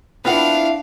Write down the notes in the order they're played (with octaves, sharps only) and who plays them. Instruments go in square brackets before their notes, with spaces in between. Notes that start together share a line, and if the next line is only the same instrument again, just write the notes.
[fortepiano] B3 F4 F#5 [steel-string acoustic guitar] C4 E4 [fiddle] D4 F5